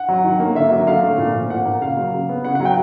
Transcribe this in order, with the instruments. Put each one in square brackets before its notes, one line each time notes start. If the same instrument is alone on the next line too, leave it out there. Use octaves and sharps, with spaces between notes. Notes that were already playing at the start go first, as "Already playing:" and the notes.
Already playing: [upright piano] F#5
F#3
D#3
A#3
D3 E5
F#3
D3 F5
A3
A#2
F3
A#2 F#5
A#3
C#3 F5
F#3
C#3
B3
C#3 F#5
F#5
F#3
G5